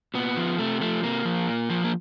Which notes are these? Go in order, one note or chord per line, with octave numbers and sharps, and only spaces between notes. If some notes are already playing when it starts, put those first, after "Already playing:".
A#2 B3
F3
C3 A3
F3 A3
C3 A#3
F3
A#2
F3
A#3